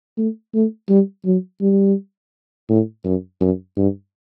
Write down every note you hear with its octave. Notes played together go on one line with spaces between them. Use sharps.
A3
A3
G3
F#3
G3
A2
F#2
F#2
G2